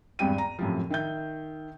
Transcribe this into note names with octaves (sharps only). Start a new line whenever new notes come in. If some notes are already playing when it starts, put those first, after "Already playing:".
G#1 E2 G2 C4 G5 D#7
A#5
F#2 A2 C3 F3
D#3 E5 G6